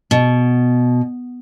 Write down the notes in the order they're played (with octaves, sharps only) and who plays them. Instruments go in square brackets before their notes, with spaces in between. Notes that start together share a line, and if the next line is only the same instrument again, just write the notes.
[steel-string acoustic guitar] B2